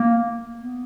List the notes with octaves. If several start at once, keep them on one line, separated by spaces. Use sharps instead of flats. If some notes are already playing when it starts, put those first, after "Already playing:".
Already playing: A#3
B3